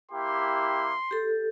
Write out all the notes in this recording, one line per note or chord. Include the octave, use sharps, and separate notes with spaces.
A#3 E4 G4 C6
G4 A4